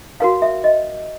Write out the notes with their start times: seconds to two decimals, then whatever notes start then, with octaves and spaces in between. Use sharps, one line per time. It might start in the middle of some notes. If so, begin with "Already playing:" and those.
0.20 F#4 A#4 C#5 F5
0.42 E5
0.64 D#5